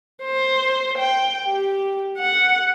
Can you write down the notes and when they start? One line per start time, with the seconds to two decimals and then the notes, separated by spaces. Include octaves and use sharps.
0.23 C5
0.98 G5
1.47 G4
2.19 F#5